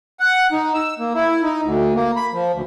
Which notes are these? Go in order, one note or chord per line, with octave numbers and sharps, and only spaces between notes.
F#5
D#4
E6
A#3
E4
D#4
D2
A#3
B5
F3
D2